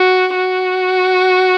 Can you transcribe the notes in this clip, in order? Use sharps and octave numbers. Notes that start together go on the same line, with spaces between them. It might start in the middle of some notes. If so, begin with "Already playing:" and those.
Already playing: F#4
F#4